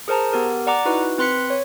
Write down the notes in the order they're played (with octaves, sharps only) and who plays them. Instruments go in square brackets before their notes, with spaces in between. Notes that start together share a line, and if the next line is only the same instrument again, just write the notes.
[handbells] G#4 A#4 C5 A5 A#5
B3 G4 A#4
D5 F#5 A#5 D6
D#4 E4 F#4 B4
C4 B4 C6 F#6 B6 C#7
C#5